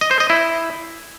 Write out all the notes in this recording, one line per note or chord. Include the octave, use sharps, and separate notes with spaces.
D#5
C5
D#5
E4